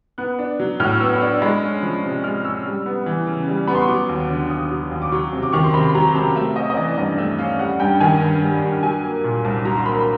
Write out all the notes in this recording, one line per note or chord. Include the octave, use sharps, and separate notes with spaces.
B3 F#6
D4
F#3
A2 F6
B3 E6
D4
G#3 B5
C#4
F3
C3
G#3 F6
C#4 E6
G3
B3
E3
C#3
G3
B3 B5
C6
C#6
F#3 D6
D#2
D3
D#2 D#6
F#3
D#2
D6
F#3 C#6
C3
D6
D#3 C#6
C6
C3 B5
F#3 A#5
C3 A5
A3 E5
C#4 D#5
D#5
E3 D5
G2 D#5
A3 E5
C#4 F5
G3 F#5
G2 G5
D#3 G#5
G2
G3
G2
F#3 G#5
A#3
A#2
C2 A5
F#3 A#5
C6
A#3 B5